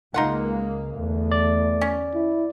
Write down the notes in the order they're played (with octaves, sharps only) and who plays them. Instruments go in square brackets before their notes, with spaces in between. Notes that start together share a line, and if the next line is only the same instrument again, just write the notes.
[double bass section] C#2 G#3 A#3 [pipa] D#4 F4 F#5
[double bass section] E2 D3 [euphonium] A3
[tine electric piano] D5
[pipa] C#4
[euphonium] E4